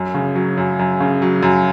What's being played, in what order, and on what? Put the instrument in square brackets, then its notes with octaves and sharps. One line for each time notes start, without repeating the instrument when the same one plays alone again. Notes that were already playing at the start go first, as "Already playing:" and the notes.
Already playing: [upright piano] F#2
C#3
F#3
F#2
F#2
C#3
F#3
F#2